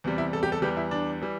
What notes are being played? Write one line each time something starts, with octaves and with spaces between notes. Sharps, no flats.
E2 C3 G3
E4
A4
G4
A4
E2 E3 G3 G4
E4
D4
E3 G3